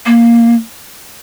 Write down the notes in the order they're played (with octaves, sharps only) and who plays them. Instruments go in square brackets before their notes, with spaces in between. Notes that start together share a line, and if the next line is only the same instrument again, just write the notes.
[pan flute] A#3